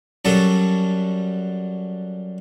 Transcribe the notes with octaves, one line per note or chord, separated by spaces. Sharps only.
F#2 F#3 G3 A4 C#6